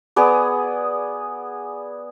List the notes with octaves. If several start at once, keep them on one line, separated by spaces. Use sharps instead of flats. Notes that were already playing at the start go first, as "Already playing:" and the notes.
B3 G#4 D5